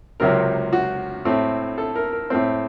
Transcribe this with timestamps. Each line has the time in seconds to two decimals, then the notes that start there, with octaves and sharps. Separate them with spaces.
0.20 C#2 C3 F#3 C4 A#4
0.73 F#4
1.25 A2 A3 C4
1.78 A4
1.95 A#4
2.13 A#4
2.30 A2 A3 C4 C5